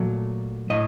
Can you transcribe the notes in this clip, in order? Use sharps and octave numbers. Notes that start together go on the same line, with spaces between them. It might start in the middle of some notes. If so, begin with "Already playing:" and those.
Already playing: A#2 F#3 A3
A2 D#5